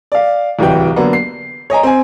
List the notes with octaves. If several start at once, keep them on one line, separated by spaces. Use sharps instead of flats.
D5 F5
D1 C2 E3 F#4 G5
D3 F#3 A#3 B3
C7
C#5 D#5 G#5 A#5
C4 G#5